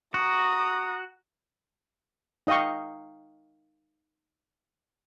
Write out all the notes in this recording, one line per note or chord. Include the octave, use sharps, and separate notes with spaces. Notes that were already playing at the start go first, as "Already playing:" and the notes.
F#4 A#5 D#6
D#4 D#5 F5 G5 C#6